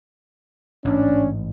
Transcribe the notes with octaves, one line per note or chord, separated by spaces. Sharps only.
A1 G#2 C#4 D4